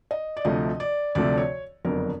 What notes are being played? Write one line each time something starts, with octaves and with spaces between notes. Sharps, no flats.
D#5
D5
D2 C3 F3 A3 D#5
D5
D2 C3 F3 A3 D5
C#5
F#1 F2 D3 F#3 B3 A#4